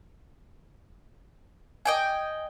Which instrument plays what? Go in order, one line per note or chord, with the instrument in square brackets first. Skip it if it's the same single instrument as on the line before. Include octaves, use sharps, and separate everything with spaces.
[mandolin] D#5 G5 G#5